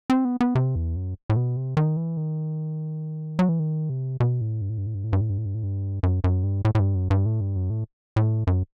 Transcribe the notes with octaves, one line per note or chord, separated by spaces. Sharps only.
C4
B3
B3
C3
E2
F#2
A2
B2
C3
D#3
E3
D#3
F#3
E3
D#3
C3
B2
A2
G2
A2
G2
A2
G2
A2
G2
A2
G2
A2
G2
A2
G2
F#2
F#2
G2
A2
A2
G2
F#2
G2
A2
G2
F#2
A2
A2
F#2